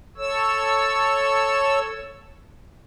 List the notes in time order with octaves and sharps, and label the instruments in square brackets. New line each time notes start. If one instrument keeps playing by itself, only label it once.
[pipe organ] A4 C#5 E6